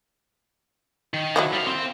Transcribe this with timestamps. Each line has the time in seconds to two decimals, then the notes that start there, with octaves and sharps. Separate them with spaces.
1.14 D#3
1.36 F3 F#3 E4
1.53 G3 F5
1.67 C4